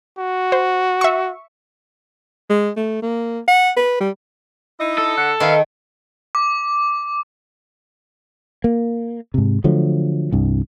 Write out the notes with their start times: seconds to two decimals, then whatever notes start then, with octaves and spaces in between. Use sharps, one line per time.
0.18 F#4
0.52 C5
1.01 E5 C#6
2.50 G#3
2.77 A3
3.02 A#3
3.48 F#5
3.77 B4
4.01 G3
4.79 D#4 E4 D#5
4.98 A4
5.16 D3 F#5
5.40 D#3 B4 E5 F5
6.35 D6
8.64 A#3
9.34 G#2 C3
9.64 D3 F3 F#3 A3
10.32 C2 G2